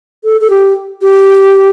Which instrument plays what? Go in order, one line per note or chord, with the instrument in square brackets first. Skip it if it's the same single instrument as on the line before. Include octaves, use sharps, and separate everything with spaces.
[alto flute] A4
A4
G4
G4